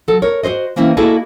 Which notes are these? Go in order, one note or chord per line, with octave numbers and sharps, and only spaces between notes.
F#3 A4
A#4 C#5
F#4 G#4 C5 D#5
E3 A#3 C4 C#4 E4
A#3 E4 F#4 G#4 A4 D#5